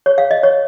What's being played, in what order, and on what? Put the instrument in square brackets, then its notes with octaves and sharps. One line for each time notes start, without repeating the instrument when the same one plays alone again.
[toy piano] C#5
F5
D#5
C#5